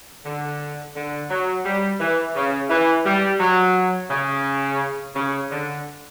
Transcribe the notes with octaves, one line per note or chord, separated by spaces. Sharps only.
D3
D3
F#3
G3
E3
C#3
E3
G3
F#3
C#3
C#3
D3